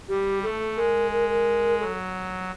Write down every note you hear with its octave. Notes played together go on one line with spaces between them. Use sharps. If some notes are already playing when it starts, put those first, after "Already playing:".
G3 G4
A3 A4
G#3 A#4
A#4
A#4
F#3 A4